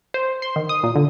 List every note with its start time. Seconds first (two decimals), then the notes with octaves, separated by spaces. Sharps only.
0.14 C5
0.42 C6
0.56 D#3
0.69 D#6
0.83 A#2
0.96 D3